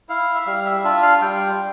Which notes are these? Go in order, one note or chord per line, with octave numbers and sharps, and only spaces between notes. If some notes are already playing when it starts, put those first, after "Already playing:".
E4 F5
E5
G3 F5
E5
D4 F4 E5
F5
G3 G5